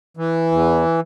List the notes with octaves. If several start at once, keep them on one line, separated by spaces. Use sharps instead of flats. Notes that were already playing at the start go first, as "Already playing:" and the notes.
E3
E2